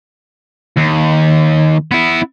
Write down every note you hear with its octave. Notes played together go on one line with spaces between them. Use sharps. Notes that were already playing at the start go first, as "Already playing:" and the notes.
D#2
B3 E4